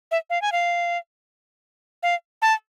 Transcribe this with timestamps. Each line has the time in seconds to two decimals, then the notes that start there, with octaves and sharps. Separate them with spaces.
0.11 E5
0.30 F5
0.42 G#5
0.52 F5
2.03 F5
2.42 A5